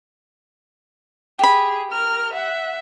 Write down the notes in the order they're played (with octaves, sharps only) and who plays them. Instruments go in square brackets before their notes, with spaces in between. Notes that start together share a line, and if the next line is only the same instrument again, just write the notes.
[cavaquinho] G4 B5 [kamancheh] G#4
[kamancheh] A#4 F6
E5 F#5